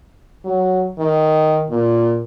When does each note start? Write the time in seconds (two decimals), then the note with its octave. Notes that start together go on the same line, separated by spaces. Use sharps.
0.45 F#3
0.98 D#3
1.70 A#2